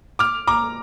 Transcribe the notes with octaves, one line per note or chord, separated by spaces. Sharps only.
D6 F6
A#5 D6